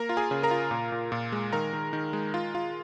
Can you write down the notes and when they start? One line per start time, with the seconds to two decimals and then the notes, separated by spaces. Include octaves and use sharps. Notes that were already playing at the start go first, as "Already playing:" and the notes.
Already playing: A#3 A#4 A#5
0.09 F4
0.17 G#4 G#5
0.31 C#3
0.43 A#4 A#5
0.51 F4
0.71 A#2
0.92 A#2
1.12 A#2
1.32 G#3
1.53 D#3 A#4 A#5
1.73 D#3
1.93 D#3
2.13 G#3
2.34 F4
2.55 F4